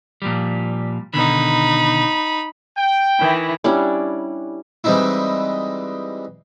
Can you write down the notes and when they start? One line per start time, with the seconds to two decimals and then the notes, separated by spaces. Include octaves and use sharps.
0.22 A#2 F3 G3
1.14 B2 D3 D#3 D#4 B5
2.77 G5
3.19 D#3 E3 E4
3.64 G3 C#4 D4 E4
4.84 E3 G3 G#3 C4 D#4 E4